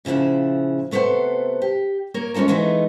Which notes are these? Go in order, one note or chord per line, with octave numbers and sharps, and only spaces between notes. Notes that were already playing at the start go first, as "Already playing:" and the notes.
A#2 C#3 F3 E4 F#5
C3 A3 B3 A4 C5 F#5
G4
A#3 A#4 C#5
G#3 C4 C#4 F4 A4
E3 G#3 A3 B3 D#4 B4